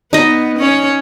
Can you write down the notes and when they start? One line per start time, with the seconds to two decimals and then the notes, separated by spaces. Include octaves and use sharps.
0.13 B3 D#4 D#5
0.59 C#4 C#5